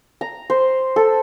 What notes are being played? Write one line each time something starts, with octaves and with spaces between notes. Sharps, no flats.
A#5
C5
A4